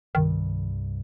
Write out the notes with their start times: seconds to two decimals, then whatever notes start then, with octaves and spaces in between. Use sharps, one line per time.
0.15 C2 G2 D#3